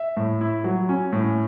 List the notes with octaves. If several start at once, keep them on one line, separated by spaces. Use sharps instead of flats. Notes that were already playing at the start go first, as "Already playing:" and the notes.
Already playing: E5
A2
E4
F#3
C#4
A2